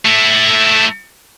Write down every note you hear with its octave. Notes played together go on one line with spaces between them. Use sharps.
A3 E4